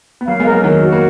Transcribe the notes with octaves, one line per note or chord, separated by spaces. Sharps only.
B3
F#3 A#3 F5
G#3 B3
A#4
F#3 A#3
D#3 F#3 A#4
F#4
A#3